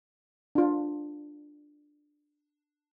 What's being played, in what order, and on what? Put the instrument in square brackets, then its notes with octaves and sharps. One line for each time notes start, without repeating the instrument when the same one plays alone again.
[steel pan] D4 F4